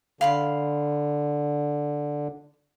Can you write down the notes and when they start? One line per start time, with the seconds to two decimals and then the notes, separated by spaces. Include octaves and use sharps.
0.21 D3 F5 B5 C6